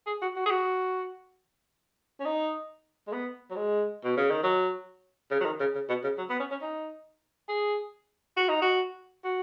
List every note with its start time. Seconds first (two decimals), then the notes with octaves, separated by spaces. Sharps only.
0.07 G#4
0.22 F#4
0.36 F#4
0.46 G#4
0.50 F#4
2.20 C#4
2.25 D#4
3.07 G#3
3.12 B3
3.50 F#3
3.56 G#3
4.04 B2
4.17 C#3
4.30 D#3
4.43 F#3
5.31 C#3
5.40 F#3
5.45 D#3
5.60 C#3
5.75 C#3
5.89 B2
6.03 C#3
6.18 F#3
6.30 B3
6.40 C#4
6.51 C#4
6.61 D#4
7.49 G#4
8.37 F#4
8.49 D#4
8.62 F#4
9.24 F#4